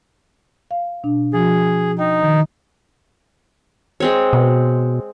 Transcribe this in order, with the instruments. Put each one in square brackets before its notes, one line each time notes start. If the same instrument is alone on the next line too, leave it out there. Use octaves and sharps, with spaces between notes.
[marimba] F5
B2 D4
[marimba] F3 F#4 [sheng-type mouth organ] G#4
[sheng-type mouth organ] D#4 [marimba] G5 A#5
[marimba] D#3
[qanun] G#3 C4 C#5
[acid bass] B2